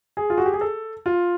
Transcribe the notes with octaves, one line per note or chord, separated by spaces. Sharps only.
G#4
F4
F#4
G4
G#4
A4
F4